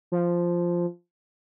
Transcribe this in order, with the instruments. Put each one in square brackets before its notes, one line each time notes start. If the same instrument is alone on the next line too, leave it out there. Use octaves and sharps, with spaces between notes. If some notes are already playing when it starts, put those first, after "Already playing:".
[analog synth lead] F3